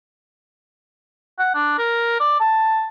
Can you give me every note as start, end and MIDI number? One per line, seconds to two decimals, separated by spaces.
1.39 1.52 78
1.55 1.74 62
1.78 2.16 70
2.20 2.39 74
2.40 2.87 81